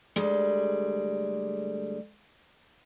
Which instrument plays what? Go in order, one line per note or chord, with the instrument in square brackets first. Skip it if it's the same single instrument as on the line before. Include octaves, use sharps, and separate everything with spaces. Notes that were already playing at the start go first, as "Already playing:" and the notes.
[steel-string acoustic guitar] D2 G3 G#3